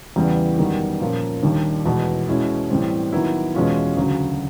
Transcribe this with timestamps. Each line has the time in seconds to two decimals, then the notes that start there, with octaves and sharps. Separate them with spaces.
0.16 E2 C#3 E3 G3 B3
0.58 F#2 D#3 G3 B3
1.01 A#2 F3 A#3 C#4
1.43 D#2 D#3 G3 A#3 D4
1.86 E2 B2 G#3
2.28 B2 G#3 C#4 E4
2.70 A2 E3 G3 C4
3.12 D#3 F#3 B3 E4
3.54 E2 B2 G#3 C#4 F4
3.97 D2 C#3 F#3